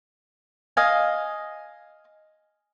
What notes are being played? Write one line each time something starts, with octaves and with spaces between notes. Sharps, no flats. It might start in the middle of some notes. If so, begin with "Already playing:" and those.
D#5 F5 G#5